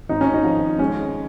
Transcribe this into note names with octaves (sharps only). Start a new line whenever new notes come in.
G#1 D#4
C#4
D#4
F3
G#3 C#4